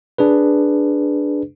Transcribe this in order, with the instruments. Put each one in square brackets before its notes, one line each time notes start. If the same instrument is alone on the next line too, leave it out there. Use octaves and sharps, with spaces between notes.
[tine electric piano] D4 G#4 B4